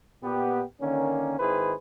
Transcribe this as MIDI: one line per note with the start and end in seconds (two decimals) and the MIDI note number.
0.23 0.62 46
0.23 0.62 59
0.23 0.62 67
0.81 1.39 50
0.81 1.39 51
0.81 1.39 58
0.81 1.39 61
1.39 1.73 32
1.39 1.73 51
1.39 1.73 64
1.39 1.73 68
1.39 1.73 71
1.39 1.73 72